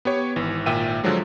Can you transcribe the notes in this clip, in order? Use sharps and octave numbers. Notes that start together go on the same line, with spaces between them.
B3 G4 C#5
G#1 E3
G#1 A#2 E5 G5 D#7
D3 F3 F#3 G#3